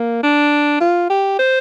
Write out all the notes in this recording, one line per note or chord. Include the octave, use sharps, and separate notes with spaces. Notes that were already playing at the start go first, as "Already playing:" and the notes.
Already playing: A#3
D4
F4
G4
C5